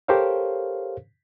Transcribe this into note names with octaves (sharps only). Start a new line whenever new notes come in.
G4 A4 A#4 C5 C#5 F5